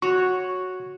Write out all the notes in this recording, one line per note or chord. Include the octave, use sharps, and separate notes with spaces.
F#4 C#5 C#6